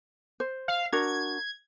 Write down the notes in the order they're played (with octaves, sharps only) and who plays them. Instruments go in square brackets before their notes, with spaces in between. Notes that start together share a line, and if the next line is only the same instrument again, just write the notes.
[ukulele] C5
[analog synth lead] F5
[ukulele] D4 F#4 A#4 [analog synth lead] G#6